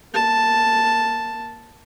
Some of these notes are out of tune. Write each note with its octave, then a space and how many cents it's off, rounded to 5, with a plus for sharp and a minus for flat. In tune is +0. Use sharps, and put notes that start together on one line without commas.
A#3 +10 A5 +0